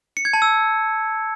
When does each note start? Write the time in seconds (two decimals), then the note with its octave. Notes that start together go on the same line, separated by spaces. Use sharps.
0.17 C#7
0.25 G#6
0.33 A5
0.42 E6